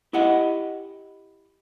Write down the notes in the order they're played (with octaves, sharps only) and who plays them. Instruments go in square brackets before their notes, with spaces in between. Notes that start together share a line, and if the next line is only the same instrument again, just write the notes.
[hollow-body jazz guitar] E4 G4 D#5 F#5